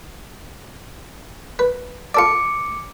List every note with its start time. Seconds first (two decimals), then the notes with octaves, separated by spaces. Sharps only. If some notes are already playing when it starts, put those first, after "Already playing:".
1.59 B4
2.14 F4 A4 D5 D6 C#7